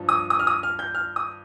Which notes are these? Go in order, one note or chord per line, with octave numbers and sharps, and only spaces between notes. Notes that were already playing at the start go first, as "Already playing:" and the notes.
Already playing: G2 F3
D#6
D#6
F6
D#6
F6
G6
F6
D#6